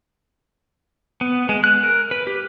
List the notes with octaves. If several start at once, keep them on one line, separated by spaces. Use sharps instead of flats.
B3
G#3
F#6
A#4
B4
G4